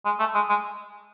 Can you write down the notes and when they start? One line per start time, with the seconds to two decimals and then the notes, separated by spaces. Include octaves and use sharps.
0.05 G#3
0.19 A3
0.34 G#3
0.49 G#3